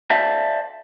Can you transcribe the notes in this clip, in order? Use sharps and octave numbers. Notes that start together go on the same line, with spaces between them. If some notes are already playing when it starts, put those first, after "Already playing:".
C5 D5 E5 F5 A5